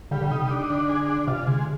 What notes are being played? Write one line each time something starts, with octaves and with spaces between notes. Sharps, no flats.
D3 G3
D3
C3 D#4
D4
D3
G#4
D4
C3 F4
D3 G#3